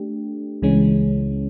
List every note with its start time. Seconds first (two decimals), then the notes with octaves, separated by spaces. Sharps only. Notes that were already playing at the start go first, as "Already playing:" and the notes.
Already playing: A3 D4 G4
0.62 C#2 C#3 E3 G#3 C#4